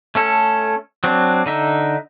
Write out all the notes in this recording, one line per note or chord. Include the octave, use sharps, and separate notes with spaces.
A3 C#4 A4
F#3 C4 D4
D3 D#4 E5